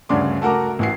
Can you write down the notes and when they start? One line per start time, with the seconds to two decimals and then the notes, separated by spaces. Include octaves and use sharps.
0.09 D2 G2 C#3 D5 C6 D6
0.42 A3 F#4 A#4 A#5 D6
0.79 A1 F#4 C7